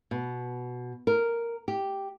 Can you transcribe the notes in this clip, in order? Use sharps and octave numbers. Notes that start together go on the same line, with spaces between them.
B2
A#4
G4